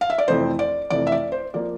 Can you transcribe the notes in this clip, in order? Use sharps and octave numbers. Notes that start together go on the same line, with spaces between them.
F5
E5
D5
F2 C3 E3 A3 C5
D5
F2 C3 E3 A3 D5
E5
D5
C5
F3 A#3 D5